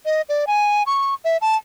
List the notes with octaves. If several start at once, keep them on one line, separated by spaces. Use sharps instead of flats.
D#5
D5
G#5
C#6
E5
A5